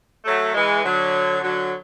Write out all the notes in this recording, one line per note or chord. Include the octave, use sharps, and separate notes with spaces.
F#3 A3
E3 G#3
D3 F#3
D3 F#3